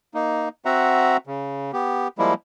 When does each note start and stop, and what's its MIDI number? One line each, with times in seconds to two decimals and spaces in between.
0.14 0.49 58
0.14 0.49 63
0.65 1.17 60
0.65 1.17 66
0.65 1.17 76
0.65 1.17 78
0.65 1.17 82
1.27 1.71 49
1.73 2.08 59
1.73 2.08 67
2.18 2.34 53
2.18 2.34 55
2.18 2.34 56
2.18 2.34 58
2.18 2.34 64